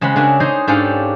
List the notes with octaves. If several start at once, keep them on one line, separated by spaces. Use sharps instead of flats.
C#3 G#3 C4 F#5 B5
C#3 D4 F#4 A#4 E5 G#5
D#4 G#4 C5 D#5
G#2 C#4 D4 G4 A4 F5